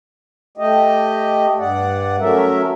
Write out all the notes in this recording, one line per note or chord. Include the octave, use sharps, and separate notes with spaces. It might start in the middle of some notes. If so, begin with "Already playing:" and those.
A3 G4 D#5
G2 D5 F#5
F#3 A3 C#4 A#4 E5